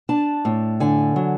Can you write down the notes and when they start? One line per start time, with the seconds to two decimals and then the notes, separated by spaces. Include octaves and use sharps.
0.09 D4 A5
0.45 A2
0.80 D3 G#5
1.16 F#3